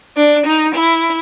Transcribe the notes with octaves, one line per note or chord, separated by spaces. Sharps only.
D4
D#4
E4